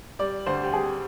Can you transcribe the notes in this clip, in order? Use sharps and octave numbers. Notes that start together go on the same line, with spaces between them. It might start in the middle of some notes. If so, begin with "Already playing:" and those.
G3 D5
D2 C5
G4
G3 G#4